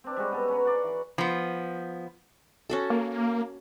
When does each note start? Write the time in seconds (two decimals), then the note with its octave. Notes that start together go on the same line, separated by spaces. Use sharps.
0.04 C4 D4
0.16 G3 G#3 C#4 F#4
0.32 B3 A4
0.48 C#4 B4 A#5
0.65 F#4 D5 C6
0.83 E3
1.18 F3 B3
2.70 C#4 F#4 A4
2.90 A#3